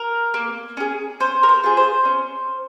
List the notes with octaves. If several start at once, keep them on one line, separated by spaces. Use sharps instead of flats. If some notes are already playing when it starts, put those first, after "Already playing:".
Already playing: A#4
A#3
C#4 G#4
C#4 C5
A#4
C5
F4 G#4
C5
C#4